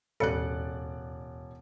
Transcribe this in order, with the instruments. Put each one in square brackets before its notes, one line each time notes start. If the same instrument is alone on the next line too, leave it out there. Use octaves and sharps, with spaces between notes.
[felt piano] E1 D5 F#6 [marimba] D#2 A2 [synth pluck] A4 C#7